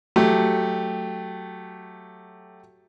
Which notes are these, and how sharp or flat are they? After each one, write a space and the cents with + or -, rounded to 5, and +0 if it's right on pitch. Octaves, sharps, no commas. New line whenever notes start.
F#3 +0 A3 +0 G4 +0